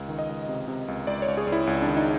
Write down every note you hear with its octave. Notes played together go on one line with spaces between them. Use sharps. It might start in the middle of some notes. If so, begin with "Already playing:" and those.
Already playing: C#2
D#3
D#5
C#2
C3
C3
C#2
C#2 D5
C#5
C#2
G#4
C#2
E4
C#2
D4
D#3
D#4